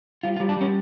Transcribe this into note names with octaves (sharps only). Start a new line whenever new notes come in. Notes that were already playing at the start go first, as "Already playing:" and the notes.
G3 F4
F4
G3
D4
G3 C#4